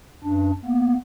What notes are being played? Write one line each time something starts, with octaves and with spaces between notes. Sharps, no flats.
F#2 D4
A#3 B3